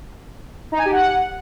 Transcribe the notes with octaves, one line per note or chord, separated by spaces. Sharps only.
D#4
G#5
G4
F#5